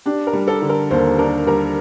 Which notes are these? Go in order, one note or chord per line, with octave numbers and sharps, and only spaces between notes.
D4 G4
A#4
G3
A4
D3
A#4
D#2 C5
D4 A#4
G3 A#4